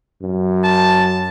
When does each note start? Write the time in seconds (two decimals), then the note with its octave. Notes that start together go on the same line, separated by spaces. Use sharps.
0.22 F#2
0.64 A5